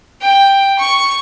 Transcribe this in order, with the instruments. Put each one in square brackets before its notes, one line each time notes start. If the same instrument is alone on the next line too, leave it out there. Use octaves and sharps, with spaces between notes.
[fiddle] G5
C#6